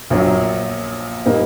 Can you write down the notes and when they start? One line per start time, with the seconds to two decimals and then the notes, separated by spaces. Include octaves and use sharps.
0.10 A#1 A#2 F#3
1.26 A#2 G3 A#3 D#4